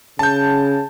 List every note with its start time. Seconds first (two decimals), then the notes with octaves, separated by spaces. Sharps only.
0.19 C#3 A5 G6